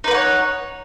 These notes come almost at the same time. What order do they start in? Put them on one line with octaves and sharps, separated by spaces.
D#4 B4 F#5 C#5